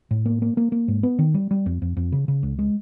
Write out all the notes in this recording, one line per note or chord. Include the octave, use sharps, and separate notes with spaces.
A2
A#3
A#3
A#3
A#3
G#2
B3
D#3
G3
G3
F2
F2
F2
C#3
C#3
C#2
G#3